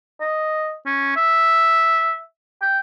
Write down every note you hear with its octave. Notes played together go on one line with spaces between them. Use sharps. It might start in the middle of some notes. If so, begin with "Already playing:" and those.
D#5
C#4
E5
G5